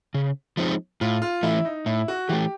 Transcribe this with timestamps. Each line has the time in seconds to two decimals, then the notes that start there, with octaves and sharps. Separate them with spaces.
0.14 C#3
0.57 F3 G#3 C4 D#4
1.01 A2 F4
1.22 F4
1.43 E3 A3 E4
1.65 D#4
1.86 A2 E4
2.08 F#4
2.29 E3 A3 G4